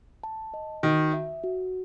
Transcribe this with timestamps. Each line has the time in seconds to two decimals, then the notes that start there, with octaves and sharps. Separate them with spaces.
0.23 A5
0.54 D#5
0.83 D#3 F#4
1.13 E5
1.43 F#4